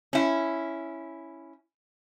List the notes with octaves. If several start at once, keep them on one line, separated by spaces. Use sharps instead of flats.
C#4 E4